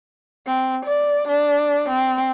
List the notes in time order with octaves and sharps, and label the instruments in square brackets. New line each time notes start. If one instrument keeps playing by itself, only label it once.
[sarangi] C4
D5
D4
C4